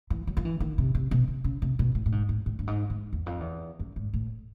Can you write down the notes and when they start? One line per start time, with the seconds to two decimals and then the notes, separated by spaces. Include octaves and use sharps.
0.10 E3
0.27 F#3
0.37 F3
0.45 E3
0.60 D#3
0.78 C3
0.95 C3
1.11 B2
1.28 C3
1.44 C#3
1.62 C3
1.79 B2
1.95 A2
2.06 A2
2.12 G#2
2.29 A2
2.46 A2
2.59 G2
2.67 G#2
2.90 G#2
3.13 E2
3.26 F2
3.40 E2
3.79 F#2
3.96 G#2
4.14 A2